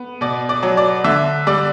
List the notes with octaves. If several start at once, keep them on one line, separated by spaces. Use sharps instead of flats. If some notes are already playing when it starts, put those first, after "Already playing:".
Already playing: B3
B2 D5
D5
F#3
D5
D3 E5
G3 D5